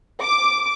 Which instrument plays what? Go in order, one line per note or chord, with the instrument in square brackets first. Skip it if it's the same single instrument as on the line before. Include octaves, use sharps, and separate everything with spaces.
[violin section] D6